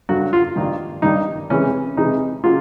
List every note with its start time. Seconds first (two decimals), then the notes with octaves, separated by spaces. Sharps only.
0.09 G2 D3 F#3 F#4
0.33 F4
0.56 G2 D#3 G3 A#3
1.02 G2 D#3 G3 A#3 D#4
1.50 C3 E3 G#3 C#4
1.96 C3 E3 G#3 D#4
2.44 C#3 F#3 A#3 F4